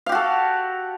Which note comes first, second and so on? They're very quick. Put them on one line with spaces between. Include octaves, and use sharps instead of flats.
F5 G4 F#4 A4